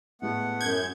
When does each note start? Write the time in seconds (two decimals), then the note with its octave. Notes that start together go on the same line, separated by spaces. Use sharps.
0.22 A2 G#3 A3 B3 F#5
0.61 F#2 G6 G#6